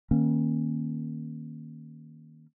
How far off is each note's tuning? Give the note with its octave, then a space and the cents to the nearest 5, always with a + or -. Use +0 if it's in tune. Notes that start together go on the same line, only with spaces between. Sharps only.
D#3 +0 A#3 +5 C#4 -25